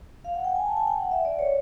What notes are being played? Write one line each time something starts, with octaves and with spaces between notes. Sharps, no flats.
F5
F#5
G5
G#5
A5
G5
G#5
G5
F#5
E5
D5
C#5